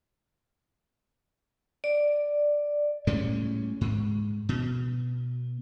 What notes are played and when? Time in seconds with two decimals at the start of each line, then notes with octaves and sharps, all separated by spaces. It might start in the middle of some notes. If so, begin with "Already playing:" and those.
1.84 D5
3.07 A2 G3 G#3 C#4
3.81 G#2
4.49 B2